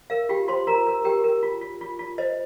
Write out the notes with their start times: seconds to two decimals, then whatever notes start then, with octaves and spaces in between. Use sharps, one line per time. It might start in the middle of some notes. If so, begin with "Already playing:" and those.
0.10 A#4 F5
0.29 F4 G4 G5
0.48 F4 C5 C6
0.67 F4 A#4 A#5
0.87 A#4
1.04 G4 A#4 G5
1.24 A#4
1.43 F4
1.61 F4
1.81 F4
1.99 F4
2.18 C5 D#5